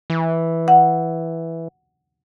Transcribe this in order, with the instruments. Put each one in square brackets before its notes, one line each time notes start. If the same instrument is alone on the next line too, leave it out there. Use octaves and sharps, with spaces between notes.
[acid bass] E3
[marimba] F#5